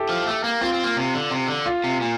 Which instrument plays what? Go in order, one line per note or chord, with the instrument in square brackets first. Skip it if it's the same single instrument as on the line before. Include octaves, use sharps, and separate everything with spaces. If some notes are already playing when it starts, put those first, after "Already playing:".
Already playing: [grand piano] E4 G4 A4
[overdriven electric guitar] F3
A3
A#3
[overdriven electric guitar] C4 [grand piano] F4
[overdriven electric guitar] C4
A#3
C3
D3
C3
D3
[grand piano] F4
[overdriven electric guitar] C3
A#2